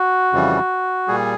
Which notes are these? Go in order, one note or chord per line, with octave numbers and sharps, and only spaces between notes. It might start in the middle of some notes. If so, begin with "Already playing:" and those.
Already playing: F#4
F2 C#3 E3 G3
A#2 G3 G#4